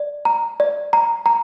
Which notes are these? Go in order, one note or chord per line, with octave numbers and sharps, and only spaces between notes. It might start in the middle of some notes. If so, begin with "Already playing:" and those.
Already playing: D5
A#5
D5
A#5
A#5